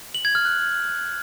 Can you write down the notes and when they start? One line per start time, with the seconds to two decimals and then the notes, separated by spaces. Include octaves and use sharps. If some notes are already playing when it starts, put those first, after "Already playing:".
0.15 F#7
0.25 G#6
0.35 F6
0.45 F#6